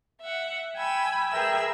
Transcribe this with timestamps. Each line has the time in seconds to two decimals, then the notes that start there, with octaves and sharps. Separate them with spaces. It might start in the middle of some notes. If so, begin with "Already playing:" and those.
0.21 E5 F#5
0.75 G5 G#5 B5 E6
1.30 G#4 A#4 B4 E5 G5 E6